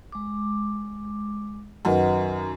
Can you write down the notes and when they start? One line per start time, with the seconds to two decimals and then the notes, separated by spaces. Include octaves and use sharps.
0.12 G#3 D6
1.85 F#2 D#3 B4 D#5 F#5